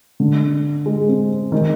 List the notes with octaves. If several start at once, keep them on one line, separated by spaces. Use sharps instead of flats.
D3
G#3
C4
D#3